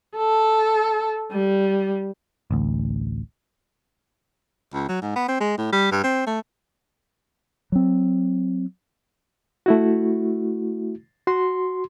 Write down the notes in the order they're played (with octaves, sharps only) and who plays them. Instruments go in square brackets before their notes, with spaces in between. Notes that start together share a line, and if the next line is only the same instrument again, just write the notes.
[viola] A4
G3
[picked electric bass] A1 D2
[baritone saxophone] C#2
F#3
G#2
B3
C4
G#3
A2
G3
G2
C4
A3
[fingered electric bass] F#3 C4
[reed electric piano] A3 E4 F#4
F#4 C6